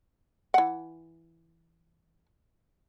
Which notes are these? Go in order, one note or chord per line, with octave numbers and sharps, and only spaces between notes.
E3 F#5